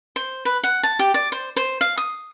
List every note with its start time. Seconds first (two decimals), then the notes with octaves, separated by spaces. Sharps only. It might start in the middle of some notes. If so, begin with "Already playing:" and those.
0.16 C5
0.45 B4
0.64 F#5
0.83 A5
0.99 G4
1.14 D5
1.32 C5
1.57 C5
1.81 F5
1.98 D#6